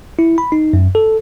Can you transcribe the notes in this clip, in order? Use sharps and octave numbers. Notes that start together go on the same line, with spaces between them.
E4
B5
D#4
F#2
A4